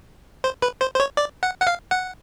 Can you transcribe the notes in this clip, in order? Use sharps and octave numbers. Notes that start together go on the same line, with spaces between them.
C5
B4
C5
C5
C#5
D5
F#5
F#5
F5
F#5